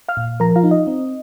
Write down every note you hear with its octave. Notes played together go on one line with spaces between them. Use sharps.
F5 F6
A#2
F3 A#4 A#5
F4 F5
D#4
D#5
C4